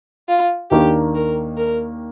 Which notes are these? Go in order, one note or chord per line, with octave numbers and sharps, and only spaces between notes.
F4
D#2 D#3 A#3 D4 G4
A#4
A#4